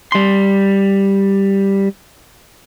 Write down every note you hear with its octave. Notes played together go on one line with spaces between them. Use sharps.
G3 C6